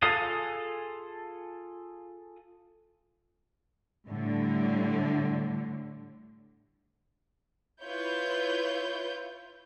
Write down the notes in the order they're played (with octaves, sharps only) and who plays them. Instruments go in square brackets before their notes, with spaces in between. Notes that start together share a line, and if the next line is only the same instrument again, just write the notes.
[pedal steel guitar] F4 G#4 A4 F5 D#6
[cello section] A2 D3 G3
[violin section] E4 F4 B4 C#5 G6